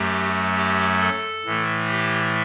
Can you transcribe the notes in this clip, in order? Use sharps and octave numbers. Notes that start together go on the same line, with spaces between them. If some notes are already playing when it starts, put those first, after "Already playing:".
Already playing: F#2 F#3 A3 G4
G4
A4
A2 E3 A3
G4